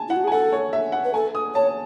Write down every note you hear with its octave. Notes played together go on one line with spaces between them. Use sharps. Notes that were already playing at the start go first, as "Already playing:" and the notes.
Already playing: G#5 A5
E4 F#5
F#4
G#4
G#5
A4 F#5
C#5
E5
F#5
B4
A4 G#5
D#6
C#5 A5